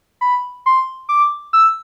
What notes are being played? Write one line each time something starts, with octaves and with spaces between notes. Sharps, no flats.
B5
C6
D6
E6